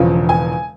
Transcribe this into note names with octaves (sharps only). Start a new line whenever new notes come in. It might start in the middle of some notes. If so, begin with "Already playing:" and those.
Already playing: E1 E2 C#3 F3
G#5